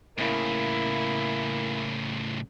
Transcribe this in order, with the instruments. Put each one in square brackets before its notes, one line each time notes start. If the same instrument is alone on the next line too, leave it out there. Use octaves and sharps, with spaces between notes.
[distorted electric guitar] A2 C#3 [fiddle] A#3 E4